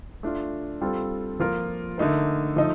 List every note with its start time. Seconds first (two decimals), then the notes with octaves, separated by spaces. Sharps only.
0.23 A3 D4 F4
0.81 G3 C4 F4 A4
1.40 F3 A#3 F4 A#4
1.98 D3 A3 D#4 A#4
2.56 F3 A3 D#4 A4 D#5